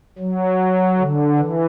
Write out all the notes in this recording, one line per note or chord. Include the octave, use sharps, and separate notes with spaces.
F#3
D3
E3